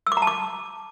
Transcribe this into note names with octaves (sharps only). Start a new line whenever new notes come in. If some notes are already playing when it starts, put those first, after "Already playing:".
E6
D6
A#5
A5
D6